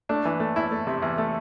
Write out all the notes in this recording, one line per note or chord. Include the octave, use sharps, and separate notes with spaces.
A3 D4
E3
A3
E2 E4
A3
C3
E2
A3